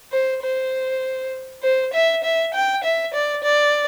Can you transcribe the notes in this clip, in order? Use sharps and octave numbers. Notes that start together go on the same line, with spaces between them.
C5
C5
C5
E5
E5
G5
E5
D5
D5